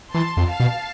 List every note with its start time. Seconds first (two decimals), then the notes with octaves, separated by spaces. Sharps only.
0.14 E3 A5 C6
0.37 F2
0.48 F5 A5
0.60 B2